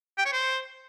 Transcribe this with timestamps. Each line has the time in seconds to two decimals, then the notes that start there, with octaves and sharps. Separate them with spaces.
0.18 G5
0.25 C#5
0.33 C5